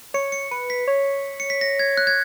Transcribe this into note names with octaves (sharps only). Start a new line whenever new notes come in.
C#5 C#7
C#7
B4 C#7
B6
C#5
C#7
B6
A#6
G#6
F#6
G#6